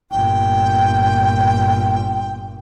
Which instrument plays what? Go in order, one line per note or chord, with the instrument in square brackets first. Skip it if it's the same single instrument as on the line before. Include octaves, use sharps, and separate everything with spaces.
[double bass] G1 A#2 [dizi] G5